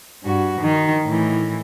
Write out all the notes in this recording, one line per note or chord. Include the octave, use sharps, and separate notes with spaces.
G2 F#4
D#3
A2 E3